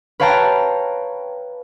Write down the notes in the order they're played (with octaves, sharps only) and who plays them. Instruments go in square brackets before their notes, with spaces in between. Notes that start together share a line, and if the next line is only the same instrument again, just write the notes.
[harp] B4 C#5 F5 G5 A5 A#5